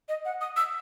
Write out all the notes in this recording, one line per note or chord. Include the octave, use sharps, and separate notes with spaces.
D#5
F#5
D#6
E6